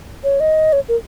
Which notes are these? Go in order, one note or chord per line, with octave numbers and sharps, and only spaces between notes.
C#5
D#5
C#5
A#4